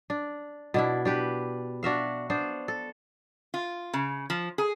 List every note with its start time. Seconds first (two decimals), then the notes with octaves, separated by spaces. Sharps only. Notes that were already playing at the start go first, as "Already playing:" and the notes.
0.10 D4
0.74 B2 D4 E4
1.05 D4 G4 B4
1.83 D4 F#4 E5 F5
2.30 B3 D4 C5
2.68 A4
3.54 F4
3.94 C#3
4.30 F3
4.58 G#4